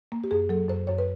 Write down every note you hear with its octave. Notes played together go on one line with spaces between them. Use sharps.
A#3
G4
F#2 G#4
F#3 A4
F#2 C5
F#2 C#5
B4